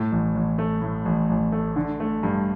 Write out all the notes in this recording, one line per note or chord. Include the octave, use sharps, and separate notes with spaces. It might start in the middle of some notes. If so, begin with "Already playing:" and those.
Already playing: A2
A1
A1
A3
A2
A1
A1
A3
D3
A3
G2